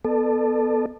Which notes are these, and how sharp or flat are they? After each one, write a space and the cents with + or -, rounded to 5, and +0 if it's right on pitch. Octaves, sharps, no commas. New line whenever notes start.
B3 +0 A4 +0 D5 +40